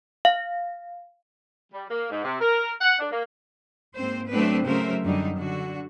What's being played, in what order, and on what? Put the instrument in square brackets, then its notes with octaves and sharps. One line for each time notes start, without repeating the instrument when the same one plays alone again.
[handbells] F5
[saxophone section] G3
A#3
G#2
C3
A#4
F#5
D4
A#3
[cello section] G#2 A#3 C4 C5
F#3 A3 B3 C4 D4 B4
C#3 F#3 A3 A#4 C5 E5
F#2 D3 F#3 G3 D#4
D3 F#4